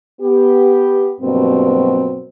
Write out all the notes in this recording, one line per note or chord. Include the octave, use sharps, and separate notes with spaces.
B3 G4
G2 B2 F3 F#3 A#3 C4